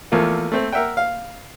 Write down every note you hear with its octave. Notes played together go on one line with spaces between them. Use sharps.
E2 F3 A3 A#3
A3 C4
A#4 E5 F#5 G5
F5